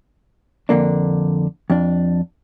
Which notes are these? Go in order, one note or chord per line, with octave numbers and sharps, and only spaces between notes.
F2 D3 A#3 D4
F2 D4